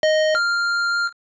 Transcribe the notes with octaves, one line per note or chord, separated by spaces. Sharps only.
D#5
F6